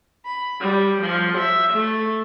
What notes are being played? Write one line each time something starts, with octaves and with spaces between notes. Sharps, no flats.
B5
G3
F3
E5
A3